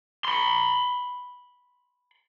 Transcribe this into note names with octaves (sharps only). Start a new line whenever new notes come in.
B5 C6